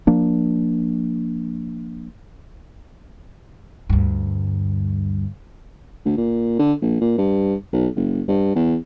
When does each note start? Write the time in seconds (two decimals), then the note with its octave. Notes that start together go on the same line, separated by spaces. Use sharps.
0.07 F3 A#3 D4
3.90 D2 G2
6.05 D2
6.17 A#2
6.59 D3
6.82 A#1
7.01 A#2
7.18 G2
7.72 B1
7.96 F#1
8.28 G2
8.55 E2